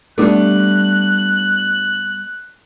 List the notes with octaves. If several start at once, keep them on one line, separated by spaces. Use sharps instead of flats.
G3 A3 B3 D4 F#6